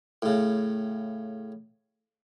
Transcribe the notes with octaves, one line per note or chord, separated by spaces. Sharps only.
A2 C#3